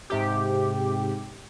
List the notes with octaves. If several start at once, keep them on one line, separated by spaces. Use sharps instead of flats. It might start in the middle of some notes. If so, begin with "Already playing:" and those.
G#2 C3 G4